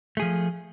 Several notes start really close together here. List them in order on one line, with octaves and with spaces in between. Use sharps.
A3 G#4 F3